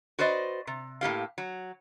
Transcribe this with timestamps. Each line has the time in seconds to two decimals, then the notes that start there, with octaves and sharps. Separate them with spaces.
0.19 F#4 B4 C5 D5 D#5
0.67 C3
1.01 A2 A#3 G4 F5
1.38 F#3